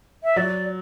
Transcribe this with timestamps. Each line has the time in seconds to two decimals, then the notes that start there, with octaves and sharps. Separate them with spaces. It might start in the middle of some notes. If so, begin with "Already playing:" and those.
0.23 E5
0.36 F#3 D5